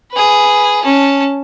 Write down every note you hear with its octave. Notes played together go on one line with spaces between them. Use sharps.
G#4 B4
C#4 A5